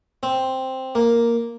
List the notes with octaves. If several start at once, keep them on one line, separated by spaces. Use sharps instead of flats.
C4
A#3